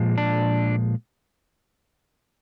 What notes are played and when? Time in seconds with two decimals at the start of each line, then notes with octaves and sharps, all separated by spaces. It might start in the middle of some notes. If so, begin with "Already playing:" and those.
Already playing: A#2 F3 G#3
0.18 D4